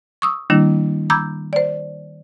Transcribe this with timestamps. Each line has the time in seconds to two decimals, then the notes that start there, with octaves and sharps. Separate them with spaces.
0.22 C#6 D#6 E6
0.50 D#3 G3 A#3 D4 E4
1.10 A#5 B5 D6 E6 G6 G#6
1.53 C5 D5